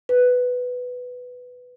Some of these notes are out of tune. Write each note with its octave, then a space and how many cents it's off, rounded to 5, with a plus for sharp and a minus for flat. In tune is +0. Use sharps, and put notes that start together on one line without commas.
B4 +5